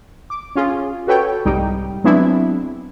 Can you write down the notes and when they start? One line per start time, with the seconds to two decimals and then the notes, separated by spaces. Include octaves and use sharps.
0.30 D6
0.56 C#4 F4 G#4
1.07 F#4 A4 B4 C#5 G5
1.45 C2 G#2 G3 D#4 G5
2.04 F#3 G#3 B3 C4 D4 E4